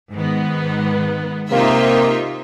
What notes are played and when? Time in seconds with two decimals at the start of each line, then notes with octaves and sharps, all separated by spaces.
0.13 G#2 D#3 B3
1.50 C3 A#3 D#4 F4 E5